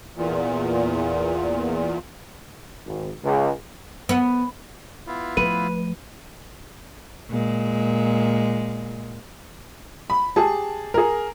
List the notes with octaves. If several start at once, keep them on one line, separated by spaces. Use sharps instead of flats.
E2 A#2
G#1
C#2
B3
B3 E4 F4
F3 A3 B4 D#7
A#2 G#3
B5
G4 G#4 A5
G#4 A#4